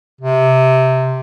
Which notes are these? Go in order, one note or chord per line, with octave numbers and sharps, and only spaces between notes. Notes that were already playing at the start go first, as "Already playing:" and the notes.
C3